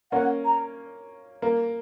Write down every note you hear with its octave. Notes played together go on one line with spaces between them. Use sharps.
A#3 C#4 F#5
A#5
A#3